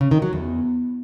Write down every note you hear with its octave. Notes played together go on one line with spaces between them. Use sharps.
C#3
D#3
F#3
E2